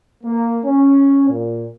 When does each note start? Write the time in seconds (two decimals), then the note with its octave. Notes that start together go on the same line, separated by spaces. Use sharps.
0.24 A#3
0.64 C#4
1.29 A#2